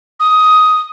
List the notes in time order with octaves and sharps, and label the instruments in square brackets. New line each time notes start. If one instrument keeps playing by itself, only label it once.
[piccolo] D#6